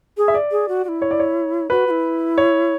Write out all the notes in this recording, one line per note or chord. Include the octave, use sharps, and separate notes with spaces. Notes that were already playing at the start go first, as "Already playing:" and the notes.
G#4
E5
D5
G#4
F#4
F#4
E4
C#5
D5
C#5
F#4 B4
F#4
E4
C#5